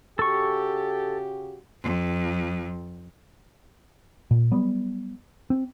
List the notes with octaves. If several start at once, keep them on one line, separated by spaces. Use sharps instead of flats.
C#3 F#4 G4 A4 C#6
F2
A#2
F#3 G3 B3
C4